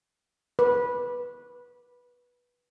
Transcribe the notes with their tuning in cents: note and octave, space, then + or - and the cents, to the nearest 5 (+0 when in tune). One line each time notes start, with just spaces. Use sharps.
B4 -15